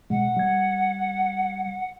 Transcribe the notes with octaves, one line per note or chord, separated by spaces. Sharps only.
B2 G#3 F#5
G3 G#6